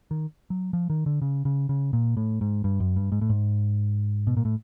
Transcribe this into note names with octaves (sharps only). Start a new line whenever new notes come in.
D#3
F#3
F3
D#3
D3
C#3
C#3
C#3
A#2
A2
G#2
G2
F#2
G2
G#2
A2
G#2
B2
A#2
A2